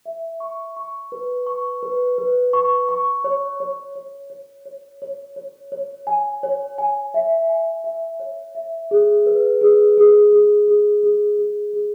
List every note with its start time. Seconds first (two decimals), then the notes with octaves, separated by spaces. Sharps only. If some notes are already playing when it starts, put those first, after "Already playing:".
0.06 E5
0.40 C#6
0.77 C#6
1.12 B4
1.47 C#6
1.83 B4
2.18 B4
2.53 C#6
2.89 C#6
3.24 C#5
3.60 C#5
3.96 C#5
4.30 C#5
4.66 C#5
5.02 C#5
5.36 C#5
5.72 C#5
6.07 G#5
6.43 C#5
6.78 G#5
7.14 E5
7.49 G#5
7.84 E5
8.20 C#5
8.55 E5
8.91 G#4
9.26 B4
9.61 G#4
9.97 G#4
10.33 G#4
10.68 G#4
11.03 G#4
11.39 G#4
11.73 G#4